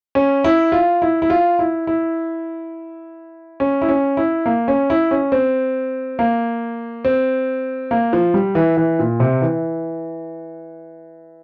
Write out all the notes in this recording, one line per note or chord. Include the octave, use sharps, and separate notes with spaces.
C#4
E4
F4
E4
E4
F4
E4
E4
C#4
E4
C#4
E4
A#3
C#4
E4
C#4
C4
A#3
C4
A#3
F3
G3
E3
E3
A#2
C3
E3